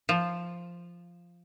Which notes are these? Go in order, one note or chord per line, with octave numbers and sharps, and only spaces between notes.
F3